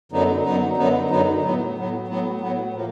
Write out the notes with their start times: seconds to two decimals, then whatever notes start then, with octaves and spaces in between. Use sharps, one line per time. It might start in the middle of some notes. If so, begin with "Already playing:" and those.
0.12 F#2 D3 F#3 B3 D#4
0.44 F#2 D3 F#3 B3 D#4
0.77 F#2 D3 F#3 B3 D#4
1.10 F#2 D3 F#3 B3 D#4
1.43 A2 F#3 B3
1.76 A2 F#3 B3
2.07 A2 F#3 B3
2.41 A2 F#3 B3
2.74 A2 F3 A#3